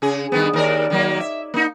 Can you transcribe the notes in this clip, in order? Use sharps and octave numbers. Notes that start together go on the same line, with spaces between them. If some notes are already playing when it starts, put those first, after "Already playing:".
C#3 G#4
G2 D#3 B3
D#2 A#4 D5
D#3 F#3 A#3
E5
A#3 D#4